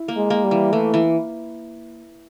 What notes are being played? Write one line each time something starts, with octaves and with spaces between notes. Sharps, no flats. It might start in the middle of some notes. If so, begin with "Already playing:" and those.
Already playing: E4
A#3
G#3
A#3
G3
E3
E3 A3
E3